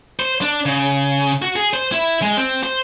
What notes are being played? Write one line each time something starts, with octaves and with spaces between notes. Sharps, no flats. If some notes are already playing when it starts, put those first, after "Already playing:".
C5
D4
C#3
F#4
G#4
C5
E4
G#3
C4
C5